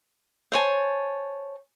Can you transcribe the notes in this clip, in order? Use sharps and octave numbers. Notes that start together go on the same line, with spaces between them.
C5 C#5 G#5 A5